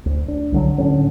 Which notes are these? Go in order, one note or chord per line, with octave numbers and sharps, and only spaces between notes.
D2
D4
C2 D3 F#3
A2 D3 C#4